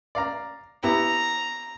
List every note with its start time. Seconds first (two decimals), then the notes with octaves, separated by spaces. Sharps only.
0.15 D5 F5 A#5
0.83 B3 E4 G4 A#5